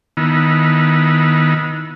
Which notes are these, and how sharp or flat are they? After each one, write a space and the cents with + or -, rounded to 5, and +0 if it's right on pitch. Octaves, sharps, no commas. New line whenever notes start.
D#3 +0 B3 -20 E4 +0